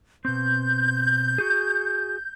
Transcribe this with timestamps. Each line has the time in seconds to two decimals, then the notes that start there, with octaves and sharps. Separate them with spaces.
0.25 B2 C4 G6
1.38 F#4 G#4